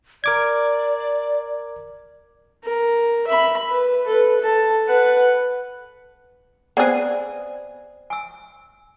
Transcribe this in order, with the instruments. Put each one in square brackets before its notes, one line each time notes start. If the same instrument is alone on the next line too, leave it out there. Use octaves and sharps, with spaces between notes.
[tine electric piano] A#4 D6 G#6 [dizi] D5
[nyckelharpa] A#4
E5 B5
B4
A4 B4
A4 A5
B4 F#5
[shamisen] B3 C4 G#4 [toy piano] C5 D5 F#5
[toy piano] G#5 E6